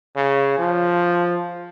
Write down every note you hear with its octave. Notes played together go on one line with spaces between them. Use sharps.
C#3
F3